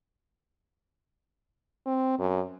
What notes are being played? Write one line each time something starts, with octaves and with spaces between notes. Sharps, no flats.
C4
F#2